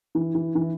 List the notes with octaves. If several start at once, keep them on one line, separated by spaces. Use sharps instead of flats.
E3
E3
E3